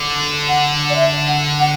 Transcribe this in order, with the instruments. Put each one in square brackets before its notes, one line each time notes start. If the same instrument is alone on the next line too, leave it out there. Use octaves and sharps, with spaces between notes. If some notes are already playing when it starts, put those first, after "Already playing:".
Already playing: [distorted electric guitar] D3
[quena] F#5
D5
E5
F#5
F#5